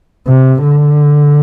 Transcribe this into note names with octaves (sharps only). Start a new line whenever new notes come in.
C3
D3